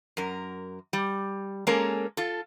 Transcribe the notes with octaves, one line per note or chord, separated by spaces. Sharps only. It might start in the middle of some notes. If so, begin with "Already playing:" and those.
F#2 A#4
G3
G#3 A#3 C#4 A4 A#4
F4 A4